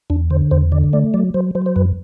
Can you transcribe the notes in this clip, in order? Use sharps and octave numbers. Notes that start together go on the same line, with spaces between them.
E2 D4
D3 C5
E2 C5
D3 D5
A3 D5
F#3 D5
F#3 C5
F#3 C5
C5
F#2 B4